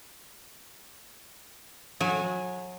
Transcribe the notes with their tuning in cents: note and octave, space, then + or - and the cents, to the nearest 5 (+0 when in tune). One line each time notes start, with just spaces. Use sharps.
F#3 -30 G#5 +0